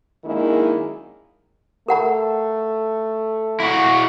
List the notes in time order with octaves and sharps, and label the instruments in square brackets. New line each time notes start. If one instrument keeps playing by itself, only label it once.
[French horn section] F#2 D#3 G#3 A#3 D4 E4
[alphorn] A3 [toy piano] A#4 F#5 A#5
[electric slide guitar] E4 F#4